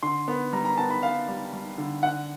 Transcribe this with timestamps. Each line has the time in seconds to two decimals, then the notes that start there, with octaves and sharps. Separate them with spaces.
0.03 D3 C6
0.28 B3
0.53 G3 A#5
0.65 A#5
0.78 B3 A5
0.90 B5
1.03 B3 F5
1.28 G3
1.53 G3
1.78 D3
2.03 D3 F#5